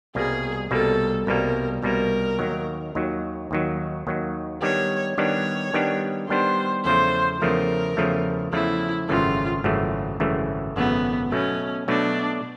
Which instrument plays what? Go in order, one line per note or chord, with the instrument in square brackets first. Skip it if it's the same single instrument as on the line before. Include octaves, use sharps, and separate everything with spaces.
[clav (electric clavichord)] C2 B2 G3 A#3 [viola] G#4
[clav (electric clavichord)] C2 B2 G3 A#3 [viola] A4
[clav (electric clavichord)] C2 B2 G3 A#3 [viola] A#4
[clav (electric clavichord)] C2 B2 G3 A#3 [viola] A#4
[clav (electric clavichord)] D#2 D#3 F#3
D#2 D#3 F#3
D#2 D#3 F#3
D#2 D#3 F#3
[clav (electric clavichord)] D#3 G3 B3 D4 G4 [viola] C#5
[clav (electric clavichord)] D#3 G3 B3 D4 G4 [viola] C#5
[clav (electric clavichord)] D#3 G3 B3 D4 G4
[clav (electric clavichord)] D#3 G3 B3 D4 G4 [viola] C5
[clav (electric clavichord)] E2 C#3 F3 A3 [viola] C5
[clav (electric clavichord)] E2 C#3 F3 A3 [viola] A#4
[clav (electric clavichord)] E2 C#3 F3 A3
[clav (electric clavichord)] E2 C#3 F3 A3 [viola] E4
[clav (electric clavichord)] G#1 F#2 C#3 E3 A3 [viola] F4
[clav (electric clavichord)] G#1 F#2 C#3 E3 A3
G#1 F#2 C#3 E3 A3
[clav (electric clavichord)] G#1 F#2 C#3 E3 A3 [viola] B3
[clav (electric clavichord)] B2 F#3 A3 [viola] C#4
[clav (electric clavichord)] B2 F#3 A3 [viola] D4